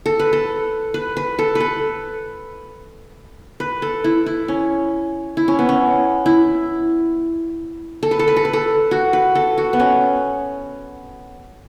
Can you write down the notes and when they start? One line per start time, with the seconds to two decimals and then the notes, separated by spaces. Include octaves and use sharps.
0.06 A4
0.19 B4
0.33 A4
0.94 B4
1.17 B4
1.39 A4
1.55 B4
1.60 A4
3.60 B4
3.82 A4
4.04 E4
4.26 E4
4.48 C#4
5.37 E4
5.48 C#4
5.59 B3
5.69 C#4
6.26 E4
8.03 A4
8.11 B4
8.19 A4
8.28 B4
8.37 A4
8.45 B4
8.53 A4
8.91 F#4
9.13 B4
9.35 A4
9.58 F#4
9.73 B3
9.80 C#4